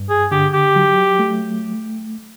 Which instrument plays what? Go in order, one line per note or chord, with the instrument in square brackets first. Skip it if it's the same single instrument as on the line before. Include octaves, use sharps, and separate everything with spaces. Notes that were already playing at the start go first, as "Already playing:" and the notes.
Already playing: [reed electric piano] G2
[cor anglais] G#4
[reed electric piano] D3 [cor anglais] G4
[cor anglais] G4
[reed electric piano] F#3
A3